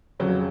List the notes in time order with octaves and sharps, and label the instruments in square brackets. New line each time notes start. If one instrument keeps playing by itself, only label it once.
[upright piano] F2 C#3 F#3